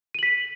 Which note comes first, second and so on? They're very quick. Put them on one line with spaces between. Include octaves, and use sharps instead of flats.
D#7 F#7 B6